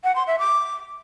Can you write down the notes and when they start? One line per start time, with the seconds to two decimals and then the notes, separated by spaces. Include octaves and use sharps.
0.04 F#5
0.15 C6
0.27 E5
0.39 D6